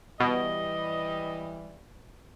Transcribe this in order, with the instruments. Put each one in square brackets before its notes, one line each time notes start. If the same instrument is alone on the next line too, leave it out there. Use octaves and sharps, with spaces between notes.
[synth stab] B2 [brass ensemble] E3 G3 [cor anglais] D#5